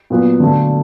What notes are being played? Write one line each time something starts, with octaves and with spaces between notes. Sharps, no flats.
A#2 F#3 B3
D3 F#3 A3